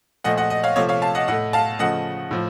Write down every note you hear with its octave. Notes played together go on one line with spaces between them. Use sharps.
A#2 F3 A3 D#5 F#5
D#5 F#5
D#5
C#5 F5
C3 F3 A3 C#5 F5
C#5 F5
F5 A5
D#5 F#5
A2 A3 D#5 F#5
F5 A5
C#3 F3 A3 D#5 F#5
A2 F3